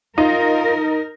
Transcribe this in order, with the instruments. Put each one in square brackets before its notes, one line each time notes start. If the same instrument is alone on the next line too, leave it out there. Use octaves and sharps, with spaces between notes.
[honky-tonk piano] D#4 [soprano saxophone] F4 [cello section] A#4